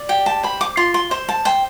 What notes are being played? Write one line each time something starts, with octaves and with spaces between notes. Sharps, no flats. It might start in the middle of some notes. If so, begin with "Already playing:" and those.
Already playing: D5
G4 G5
A5
C5 B5
D6
F4 C6
C6
C5 C6
A5
C5 G5